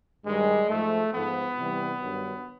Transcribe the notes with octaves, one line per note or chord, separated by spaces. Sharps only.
G2 D#3 G3 G#3
G#2 F3 A3
G#2 F3 B3
C3 E3 G3
G2 D#3 F#3